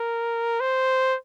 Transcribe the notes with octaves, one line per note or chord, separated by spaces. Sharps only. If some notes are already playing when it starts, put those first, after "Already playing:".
Already playing: A#4
C5